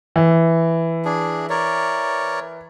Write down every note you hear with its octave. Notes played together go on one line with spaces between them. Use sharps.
E3
D4 G#4
A#4 C#5 D5